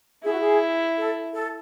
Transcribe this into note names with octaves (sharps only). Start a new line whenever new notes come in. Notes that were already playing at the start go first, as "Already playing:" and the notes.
E4 G#4
F#4
G#4
A4
A4